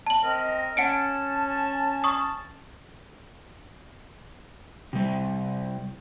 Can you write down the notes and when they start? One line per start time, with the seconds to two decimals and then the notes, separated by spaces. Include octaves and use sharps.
0.07 A5 F#7
0.23 C4 A#4 D#5
0.77 C#4 F#5 A5 C#7 D7
2.04 C#6 D#6
4.93 C3 G3